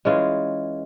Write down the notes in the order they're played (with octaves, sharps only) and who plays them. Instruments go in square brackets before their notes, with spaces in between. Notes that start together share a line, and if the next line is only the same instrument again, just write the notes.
[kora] E3 G#3 C#4 F4